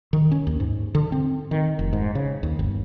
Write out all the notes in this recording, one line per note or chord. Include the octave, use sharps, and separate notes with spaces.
D#3
C#4
D#2
G#2
D3
C4
D#3
F1
G#2
C#3
D#2
G1